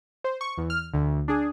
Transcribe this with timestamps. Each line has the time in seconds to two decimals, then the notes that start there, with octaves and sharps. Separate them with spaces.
0.24 C5
0.41 C#6
0.58 E2
0.70 F6
0.94 D2
1.28 D4 G#4